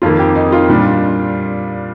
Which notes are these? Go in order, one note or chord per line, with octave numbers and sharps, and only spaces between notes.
F2 D#3 A#3 F4
G4
D#4
F4
A#2 G3 D4